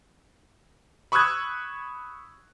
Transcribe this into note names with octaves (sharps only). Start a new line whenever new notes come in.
B5 C#6 D#6 E6 F#6 G#6